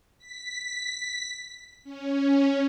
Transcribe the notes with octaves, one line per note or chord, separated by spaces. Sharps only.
B6
C#4